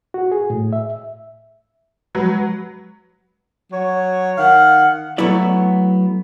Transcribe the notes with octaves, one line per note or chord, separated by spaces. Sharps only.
F#4
G#4
A2
E5
F3 F#3 G#3 B4
F#3 C#5
D#3 F5 F#5
F#3 A3 B3 E4 D5